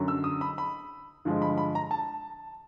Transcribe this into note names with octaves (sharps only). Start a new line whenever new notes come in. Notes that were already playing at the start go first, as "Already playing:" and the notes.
Already playing: F#2 D3 F#3
E6
D#6
B5
B5
G2 D3 F3 G#3
B5
B5
A#5
A5